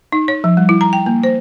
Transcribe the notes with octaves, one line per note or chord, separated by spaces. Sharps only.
D#4
C#5
F3
G3
E4
A#5
G5
A#3
C5